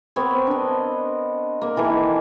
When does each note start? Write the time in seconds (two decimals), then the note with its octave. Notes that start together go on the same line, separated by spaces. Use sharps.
0.16 B3 C4 A#4 C#5
0.47 D4 D#5
1.61 A#3
1.76 D#3 E3 A4 G#5